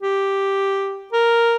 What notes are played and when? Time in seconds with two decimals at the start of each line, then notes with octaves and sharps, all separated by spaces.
0.02 G4
1.13 A#4